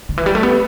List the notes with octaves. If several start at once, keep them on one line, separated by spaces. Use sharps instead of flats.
D3
E3
G3
A3
B3